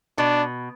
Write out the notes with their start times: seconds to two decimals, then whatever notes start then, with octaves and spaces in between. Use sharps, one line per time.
0.18 B2 D4